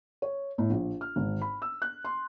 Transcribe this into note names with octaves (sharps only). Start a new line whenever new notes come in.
C#5
A2
A#1
F6
G#1
B5
E6
F#6
C6